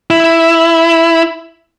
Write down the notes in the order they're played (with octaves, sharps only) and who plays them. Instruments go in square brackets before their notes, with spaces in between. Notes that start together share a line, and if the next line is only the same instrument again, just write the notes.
[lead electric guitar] E4